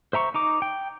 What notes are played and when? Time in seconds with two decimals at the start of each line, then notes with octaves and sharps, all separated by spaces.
0.13 C5 E5 A#5 C#6
0.34 D#4 A#5 D6
0.62 G5